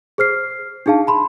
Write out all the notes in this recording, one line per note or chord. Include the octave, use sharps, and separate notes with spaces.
G#4 C5 F6 C7
D4 D#4 G#4 F5 A5
A5 B5 C6